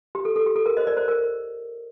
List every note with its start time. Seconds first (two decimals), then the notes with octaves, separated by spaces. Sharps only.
0.15 G4
0.25 A4
0.36 A4
0.46 G4
0.56 A4
0.66 A#4
0.77 C5 D#5
0.87 A#4 D5
0.97 C5
1.08 A#4